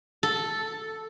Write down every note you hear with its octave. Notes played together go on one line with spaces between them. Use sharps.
A4